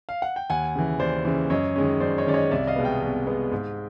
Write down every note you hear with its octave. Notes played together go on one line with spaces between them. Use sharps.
F5
F#5
G5
D#2 F#5 G#5
C#3 E3
D#2 C5 D5
C#3 E3
F#2 C#5 D#5
D#3 G#3 C#4
F#2 C5 D5
C#5 D#5
D#3 G#3 C#4 D5
C#5 D#5
C2 D5 E5
D#5 F5
B2 G#3 B3
F5 G5
C2
B2 G#3 B3
G#2